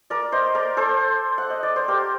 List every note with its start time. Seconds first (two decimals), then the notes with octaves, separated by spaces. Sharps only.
0.10 A#4 D5
0.32 C5 D#5
0.55 A#4 D5
0.77 A4 C5
1.38 F#5
1.50 D#5
1.63 D5
1.76 C5
1.88 G4 A#4